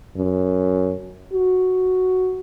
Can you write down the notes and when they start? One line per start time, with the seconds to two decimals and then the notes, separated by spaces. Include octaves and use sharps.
0.16 F#2
1.33 F#4